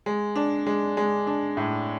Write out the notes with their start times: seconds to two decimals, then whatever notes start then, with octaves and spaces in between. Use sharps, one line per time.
0.06 G#3
0.35 D4
0.66 G#3
0.97 G#3
1.27 D4
1.57 A2